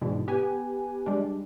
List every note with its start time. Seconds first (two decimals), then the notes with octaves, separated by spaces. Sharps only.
0.01 G#2 B2 D3 E3
0.28 B3 G4 B4 G#5
1.06 G3 G#3 D4